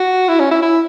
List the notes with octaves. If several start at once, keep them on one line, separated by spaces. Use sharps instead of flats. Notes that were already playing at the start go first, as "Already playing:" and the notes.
Already playing: F#4
E4
C#4
E4
E4